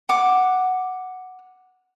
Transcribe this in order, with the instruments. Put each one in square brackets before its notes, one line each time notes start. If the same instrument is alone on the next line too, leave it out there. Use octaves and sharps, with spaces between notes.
[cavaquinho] F#5 D6